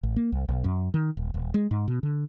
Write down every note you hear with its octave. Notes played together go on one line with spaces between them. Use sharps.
A1
A#3
C2
B1
F#2
D#3
D#1
D#1
G#3
G#2
B2
D3